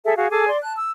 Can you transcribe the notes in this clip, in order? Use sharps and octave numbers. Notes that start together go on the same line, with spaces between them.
G#4 A4 E5
F#4 G#4 F5
G#4 A4 G#5 D6
D5 C6
A5 F#6
E6